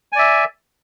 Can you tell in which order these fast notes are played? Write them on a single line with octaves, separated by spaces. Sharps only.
G#5 D5 E5